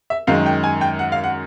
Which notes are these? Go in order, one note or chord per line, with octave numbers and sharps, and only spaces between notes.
E5
F#2 D#3 G#3 F5
G5
G#5
G5
F#5
F5
F#5